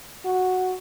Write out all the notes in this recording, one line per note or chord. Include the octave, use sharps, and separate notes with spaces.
F#4